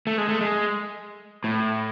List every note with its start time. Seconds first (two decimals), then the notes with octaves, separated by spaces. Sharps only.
0.07 A3
0.18 G#3
0.29 A3
0.41 G#3
1.44 A2